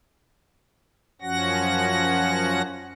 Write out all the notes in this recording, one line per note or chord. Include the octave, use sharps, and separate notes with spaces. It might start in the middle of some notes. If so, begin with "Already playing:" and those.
F#2 F3 C#4 F#4 F#5 A#6